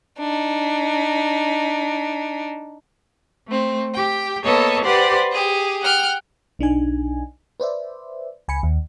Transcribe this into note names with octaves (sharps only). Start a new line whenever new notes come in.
D4 D#4
A3 C4
G4 G5
A#3 B3 A4 C#5 D#5 A5
G4 B4 C5 D5 F#5 C6
G4 G#4
F#5 G5 F6
B1 D4 D#4 G#5
B4 C5 D5 E5
C#2 G#5 B5 C#7
D#2